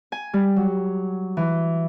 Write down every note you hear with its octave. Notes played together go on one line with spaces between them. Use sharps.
G#5
G3
F#3
E3